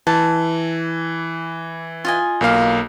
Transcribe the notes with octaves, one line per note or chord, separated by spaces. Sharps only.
E3 A5
F4 D#5 G#5
B1 A#3 F5